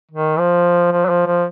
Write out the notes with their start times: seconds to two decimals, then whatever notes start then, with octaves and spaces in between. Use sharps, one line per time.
0.11 D#3
0.39 F3
0.92 F3
1.05 F#3
1.09 F3
1.26 F3